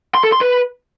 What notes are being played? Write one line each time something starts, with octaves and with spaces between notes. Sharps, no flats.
C6
A4
C6
B4